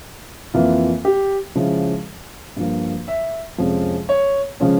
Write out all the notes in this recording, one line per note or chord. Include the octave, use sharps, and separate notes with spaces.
F2 E3 A#3 F4
G4
C#3 F3 G#3 E4
G2 F3 A#3
E5
F2 C3 F3 G#3 C#4
C#5
C#3 F3 G#3 C#4